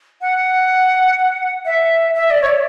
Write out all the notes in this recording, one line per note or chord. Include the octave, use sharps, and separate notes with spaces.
F#5
E5
E5
D5
C#5
D5